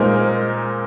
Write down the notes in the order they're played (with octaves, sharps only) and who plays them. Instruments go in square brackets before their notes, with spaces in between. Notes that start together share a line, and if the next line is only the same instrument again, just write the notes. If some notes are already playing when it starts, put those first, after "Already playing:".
Already playing: [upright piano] A#2 G#3 D#4 C5 [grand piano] A#4